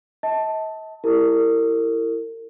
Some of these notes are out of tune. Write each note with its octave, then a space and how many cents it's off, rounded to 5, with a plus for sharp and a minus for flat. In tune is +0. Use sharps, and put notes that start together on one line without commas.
D#5 +45 A5 +0
E4 +15 G4 +5 A#4 -40